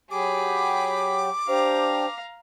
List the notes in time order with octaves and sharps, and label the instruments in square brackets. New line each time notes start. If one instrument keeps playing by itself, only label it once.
[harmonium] F#3 G4 [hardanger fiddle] G#4 B5 [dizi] D6
[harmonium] D4 G4 [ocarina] C5 [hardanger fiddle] F5 A#5